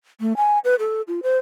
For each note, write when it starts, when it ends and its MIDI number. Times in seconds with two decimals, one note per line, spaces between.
0.21 0.36 57
0.37 0.59 80
0.65 0.75 71
0.79 1.02 69
1.08 1.20 65
1.23 1.39 72